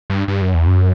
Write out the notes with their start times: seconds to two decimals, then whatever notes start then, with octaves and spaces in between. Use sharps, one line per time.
0.10 G2
0.28 G2
0.42 F#2
0.54 E2
0.67 F#2